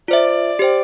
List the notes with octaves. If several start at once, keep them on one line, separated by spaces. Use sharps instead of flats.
F4 C5 D5 E5
G4 C5 G5